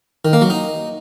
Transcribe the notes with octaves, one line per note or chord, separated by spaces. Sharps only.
D#3
A#3
F#3
D#4